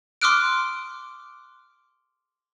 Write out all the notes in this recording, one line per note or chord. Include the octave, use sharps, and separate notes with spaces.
C6 D6 D#6 F6 F#6 D7